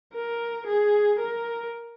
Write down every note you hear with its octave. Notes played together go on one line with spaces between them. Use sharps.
A#4
G#4
A#4